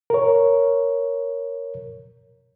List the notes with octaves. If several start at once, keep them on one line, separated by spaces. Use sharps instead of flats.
A#4 C#5